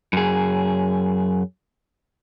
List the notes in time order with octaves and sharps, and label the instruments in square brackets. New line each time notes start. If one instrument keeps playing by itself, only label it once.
[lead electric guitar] F#2 G#4